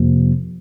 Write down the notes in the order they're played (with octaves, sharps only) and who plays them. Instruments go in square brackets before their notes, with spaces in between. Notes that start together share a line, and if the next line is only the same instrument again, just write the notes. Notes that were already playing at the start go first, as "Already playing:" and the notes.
Already playing: [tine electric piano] F2 C3 F3 A#3